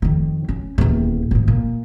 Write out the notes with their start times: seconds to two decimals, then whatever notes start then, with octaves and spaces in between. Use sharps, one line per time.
0.02 F2 D#3
0.48 C#4
0.78 D#1 E2
1.31 D#1 G#2
1.48 A#2